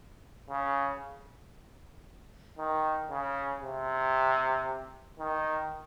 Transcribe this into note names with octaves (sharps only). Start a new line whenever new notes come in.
C#3
D#3
C#3
C3
D#3